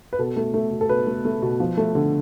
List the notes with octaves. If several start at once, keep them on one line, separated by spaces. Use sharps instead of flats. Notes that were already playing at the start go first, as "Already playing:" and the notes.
B4
B2 A4
A3
A3
B2
A4
B2 B4
A3
A3
B2
F3
A3
D3